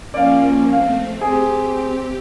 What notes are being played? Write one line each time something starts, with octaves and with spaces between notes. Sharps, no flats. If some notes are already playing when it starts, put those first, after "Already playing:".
F3 A#3 C#4 D5 F5
A3 C4 F5
C4 G4 G#4